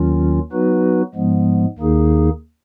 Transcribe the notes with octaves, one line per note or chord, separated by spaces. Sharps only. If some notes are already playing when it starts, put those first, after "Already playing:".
Already playing: D#2 D#3 F#3 C#4 F4
F#3 B3 D#4 F#4 B4
G#2 F3 G#3 B3
D#2 D#3 A#3 D#4 G#4